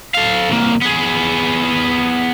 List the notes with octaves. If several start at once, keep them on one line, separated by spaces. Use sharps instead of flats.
A4 F5
C2 A#3
B3 G#4